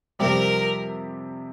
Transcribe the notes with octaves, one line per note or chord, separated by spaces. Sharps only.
F2 C3 G3 C4 G4 A#4